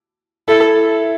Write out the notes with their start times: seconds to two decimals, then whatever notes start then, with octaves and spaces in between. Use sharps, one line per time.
0.48 E4 A4